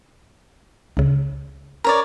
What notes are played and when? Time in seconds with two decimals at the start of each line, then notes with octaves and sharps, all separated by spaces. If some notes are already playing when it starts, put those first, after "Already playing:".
0.97 C#2 C#3
1.84 A#4 C#5 D5